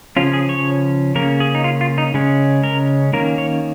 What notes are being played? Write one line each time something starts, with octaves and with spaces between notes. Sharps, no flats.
C#3 F3 C#4 F4
G#4
C#5
C#3 A#3 C#4 A#4
G#4
D#4
F4
F4
D#4
C#3 G#3 C#4
A#4
D#3 A#3 C#4 A#4
C#5